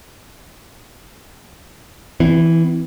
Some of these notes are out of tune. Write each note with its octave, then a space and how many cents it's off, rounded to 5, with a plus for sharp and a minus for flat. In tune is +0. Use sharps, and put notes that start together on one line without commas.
E3 +0 C4 -40